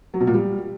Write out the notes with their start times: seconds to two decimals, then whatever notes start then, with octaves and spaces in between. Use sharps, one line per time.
0.14 F#3
0.20 B2
0.27 A#2
0.34 G3